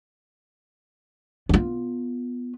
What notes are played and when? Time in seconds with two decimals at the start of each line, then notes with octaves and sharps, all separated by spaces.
1.49 B3 F4